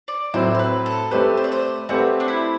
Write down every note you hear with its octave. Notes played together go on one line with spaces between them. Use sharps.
D5
A2 F#3 C4 E4 C5
C5
B4
A4
A3 C4 G4 B4 C5
C5
D5
C5
A3 C4 F#4 G4 B4
D4
E4